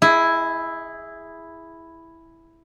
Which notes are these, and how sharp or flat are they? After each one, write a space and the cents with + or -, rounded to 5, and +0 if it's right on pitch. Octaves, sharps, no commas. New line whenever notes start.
E4 +0 G#4 -5 D#5 +40